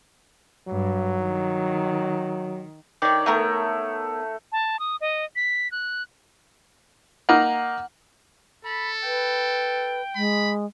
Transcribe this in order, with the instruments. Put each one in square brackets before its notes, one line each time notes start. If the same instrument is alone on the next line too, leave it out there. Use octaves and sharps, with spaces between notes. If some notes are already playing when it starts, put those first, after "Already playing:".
[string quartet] G2 [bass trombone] F#3
[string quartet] D#3
[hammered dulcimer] D#3 [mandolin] C#5 D5
[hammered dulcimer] A3 [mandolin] B3 A#4 C#5
[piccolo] A5
D#6
D#5
B6
F#6
[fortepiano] A#3 D#4 A#5 [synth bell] F#5
[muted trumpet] A4 [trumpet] B5
[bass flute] B4 [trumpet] G5
[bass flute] G#3 [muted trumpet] B5